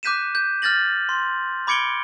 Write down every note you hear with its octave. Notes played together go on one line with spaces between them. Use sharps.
D6 F#6 G6 B6 D#7 E7
G6
F6 G6 A6 A#6 F#7
C6
B5 D6 G#6 C#7 D7 G7